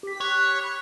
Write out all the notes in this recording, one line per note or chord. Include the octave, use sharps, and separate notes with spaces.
G4 B6
C#5 F#6
B5